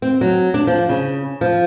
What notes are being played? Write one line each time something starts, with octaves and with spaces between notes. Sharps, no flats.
C4
F#3
D4
F3
C#3
F3